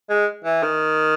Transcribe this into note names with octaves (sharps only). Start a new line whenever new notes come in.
G#3
E3
D#3